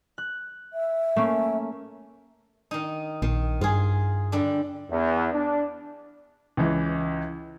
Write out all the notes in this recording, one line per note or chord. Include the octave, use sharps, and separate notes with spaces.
F#6
E5
A3 A#3 C#4
D#3 D#4
A#1 D#3
G2 F4 G#4
D3 G3 D4
E2
D4
C#2 E3